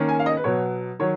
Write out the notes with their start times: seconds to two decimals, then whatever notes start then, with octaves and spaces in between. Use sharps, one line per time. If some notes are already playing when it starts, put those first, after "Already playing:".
Already playing: D#3 A#3 C#4
0.09 G#5
0.19 F5
0.26 D#5
0.37 B4
0.44 B2 F#3 B3 C#5
0.99 D#3 F#3 C#5